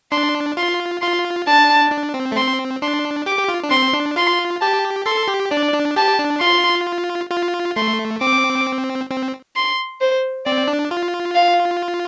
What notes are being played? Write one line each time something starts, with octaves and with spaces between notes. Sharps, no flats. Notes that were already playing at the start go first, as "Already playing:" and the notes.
D4 C6
F4 C6
F4 C6
D4 A5
D4
C4
A3
C4 C6
D4 C6
G4 D6
G4
F4
D4
C4 C6
D4
F4 C6
G4 A5
A4 C6
G4
D4 D5
D4
G4 A5
D4
F4 C6
F4
A3 C6
C4 D6
C4
C6
C5
C4 D5
D4
F4
F5